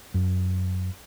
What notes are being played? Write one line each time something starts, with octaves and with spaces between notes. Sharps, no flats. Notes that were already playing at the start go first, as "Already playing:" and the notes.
F#2